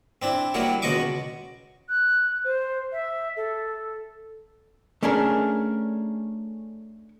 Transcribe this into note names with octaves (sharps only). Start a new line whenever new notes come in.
C4 D4 E4
F#3 G3 A#3 E4 F#4
C#2 B2 F#4 D#5 C#6 D6
F#6
C5
E5
A4
A3 C#4 D4 G#4 A#4